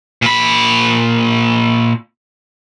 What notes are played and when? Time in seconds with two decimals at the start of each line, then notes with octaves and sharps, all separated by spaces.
0.22 A#2 B5